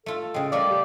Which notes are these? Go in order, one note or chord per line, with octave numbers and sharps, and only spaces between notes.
A3 F4 A4
C#3 G#3 G5
G3 A3 A#4 D5 F5
G4